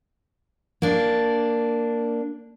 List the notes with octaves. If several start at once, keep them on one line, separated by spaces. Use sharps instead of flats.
A#3 D4